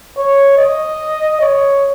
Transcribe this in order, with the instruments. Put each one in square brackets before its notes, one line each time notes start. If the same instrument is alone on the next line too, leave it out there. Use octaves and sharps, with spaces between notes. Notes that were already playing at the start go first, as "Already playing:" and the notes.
[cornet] C#5
D#5
C#5